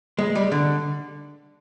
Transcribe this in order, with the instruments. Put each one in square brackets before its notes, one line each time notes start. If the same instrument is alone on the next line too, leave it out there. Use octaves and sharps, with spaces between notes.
[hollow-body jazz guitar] G#3
G3
D3